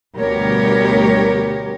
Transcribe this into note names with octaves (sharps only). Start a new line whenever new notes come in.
D2 B2 G3 G4 A#4 C#5